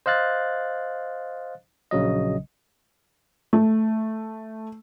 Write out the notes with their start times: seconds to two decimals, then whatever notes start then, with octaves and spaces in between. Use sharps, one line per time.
0.06 C5 D#5 F5 F#6 A6
1.91 A#1 C#3 F#3 D#5
3.53 A3